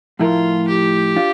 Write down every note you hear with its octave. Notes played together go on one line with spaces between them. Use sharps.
A2 F3 A3 E4 F4 A#4
G4
D4 F4